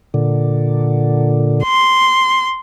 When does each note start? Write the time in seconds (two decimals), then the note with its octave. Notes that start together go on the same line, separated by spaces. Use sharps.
0.14 A#2 D3
1.63 C6